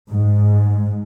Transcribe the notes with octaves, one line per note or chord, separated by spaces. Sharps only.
G#2